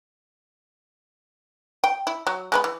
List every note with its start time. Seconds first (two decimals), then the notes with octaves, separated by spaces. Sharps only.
1.84 G5
2.07 E4
2.27 F#3
2.52 G#3 B3 B5
2.64 E3